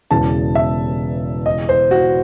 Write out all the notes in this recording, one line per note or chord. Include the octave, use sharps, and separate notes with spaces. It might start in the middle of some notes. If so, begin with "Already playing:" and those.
E1 E2 C#3 A5
E5
D#5
C5
F#4